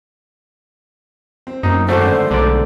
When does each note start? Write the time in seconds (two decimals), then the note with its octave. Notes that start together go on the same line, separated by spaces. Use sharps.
1.47 C4
1.63 F#2 A#3 C4 D#4
1.88 G#1 D3 A3 F#4 C5 C#6
2.31 B1 G#2 D3 A3 D5